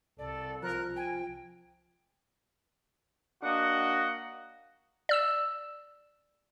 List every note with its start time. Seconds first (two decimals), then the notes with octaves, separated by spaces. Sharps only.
0.19 C2 A4 D5
0.62 F3 A#4 F#6
0.96 G5 G#5
3.43 A#3 D4 F#4 D#5 F#5
5.09 D5 E6 E7